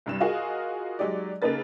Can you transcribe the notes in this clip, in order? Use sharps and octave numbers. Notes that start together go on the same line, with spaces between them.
C2 G2 E7
F4 F#4 G#4 A#4 D#5 F5
F#3 G#3 D#4 G4 D5
C#3 A#3 D#4 A4 B4 A6